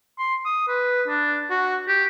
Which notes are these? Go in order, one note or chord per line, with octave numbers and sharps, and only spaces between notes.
C6
D#6
B4
D4
F#4
G4